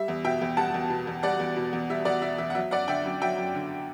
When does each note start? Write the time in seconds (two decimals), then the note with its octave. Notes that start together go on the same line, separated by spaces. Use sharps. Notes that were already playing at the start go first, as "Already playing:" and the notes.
Already playing: G3 E5
0.08 E2
0.24 B2 E5 G5
0.41 E2
0.57 G3 F#5 A5
0.74 E2
0.90 B2
1.07 E2
1.23 G3 D5 F#5
1.39 E2
1.56 B2
1.73 E2
1.89 G3 E5
2.05 E2 D5 F#5
2.22 B2 E5
2.38 E2 E5
2.50 F#5
2.55 F#3 E5
2.71 F#2 D5 F#5
2.88 D3 E5 G5
3.05 F#2
3.21 F#3 E5 G5
3.37 F#2
3.55 D3